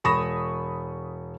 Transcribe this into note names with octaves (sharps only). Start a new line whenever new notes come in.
E1 B5 C#6 D#6 A#6 E7